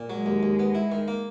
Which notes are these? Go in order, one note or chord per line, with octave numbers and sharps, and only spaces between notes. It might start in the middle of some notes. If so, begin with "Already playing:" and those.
Already playing: A#2
F#3 G#3
D#2
D#2
B3
E4
D#3
A#3